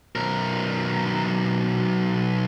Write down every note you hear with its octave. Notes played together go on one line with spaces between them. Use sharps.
B1 A#4